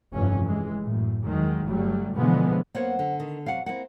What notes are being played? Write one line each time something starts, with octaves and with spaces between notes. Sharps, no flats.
F1 G2 E3 C#4
E3 G#3
F#2 A2
E2 D#3 F#3 G#3
G1 F#3 G3 A3
B2 D3 E3 F3 G#3 B3
F#2 A#3 B3 C5 C#5 F#5
D3
D#3
C3 F#3 F5 F#5
A#3 C4 E4 F#5